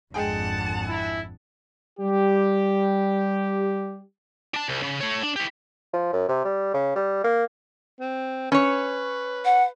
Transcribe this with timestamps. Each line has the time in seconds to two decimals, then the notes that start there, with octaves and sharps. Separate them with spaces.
0.14 G#1 F2 D3 G#3 G#4 F#5 G5 A5
0.88 E4
2.00 G3 G4
4.54 D4 A5
4.69 C2
4.83 C#3
5.00 A3 C#5
5.23 D4
5.36 E4 G4
5.94 F3
6.13 F#2
6.29 C3
6.45 G3
6.74 C#3
6.96 G3
7.24 A#3
8.00 C4
8.52 C#4 B4 C#5
9.45 F#5